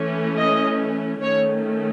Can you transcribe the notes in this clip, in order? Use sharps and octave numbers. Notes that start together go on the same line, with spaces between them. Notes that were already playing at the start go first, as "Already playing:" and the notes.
Already playing: E3 A3 C#4
D#5
D#3 A3 C#4 C#5